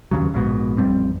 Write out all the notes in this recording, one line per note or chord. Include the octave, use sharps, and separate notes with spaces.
D#2 C#3 F#3
A#1 G#2 B2
A1 F2 G3 C4